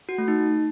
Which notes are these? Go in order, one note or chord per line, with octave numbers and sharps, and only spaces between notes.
F#4
A3
D#4